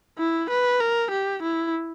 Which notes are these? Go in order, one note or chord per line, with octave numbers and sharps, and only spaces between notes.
E4
B4
A#4
G4
E4